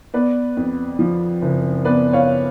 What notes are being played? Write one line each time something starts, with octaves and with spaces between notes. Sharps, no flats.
B3 B4 D5
F2
F3
F#1
B3 B4 D5
C#5 F5